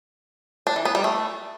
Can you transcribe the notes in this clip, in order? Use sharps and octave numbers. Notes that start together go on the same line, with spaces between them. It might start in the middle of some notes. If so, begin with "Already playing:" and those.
D4
E3
B3
G3
A3